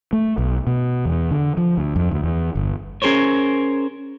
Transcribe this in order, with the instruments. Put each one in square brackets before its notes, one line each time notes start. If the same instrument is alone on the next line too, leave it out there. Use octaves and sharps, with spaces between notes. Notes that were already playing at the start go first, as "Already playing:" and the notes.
[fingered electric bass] A3
B1
B2
E2
D3
F3
D2
F2
D2
E2
G1
[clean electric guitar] C#4 G#4 A#4 C5 C#5